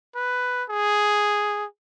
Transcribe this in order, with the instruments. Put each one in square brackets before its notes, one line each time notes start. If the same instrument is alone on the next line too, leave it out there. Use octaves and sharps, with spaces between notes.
[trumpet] B4
G#4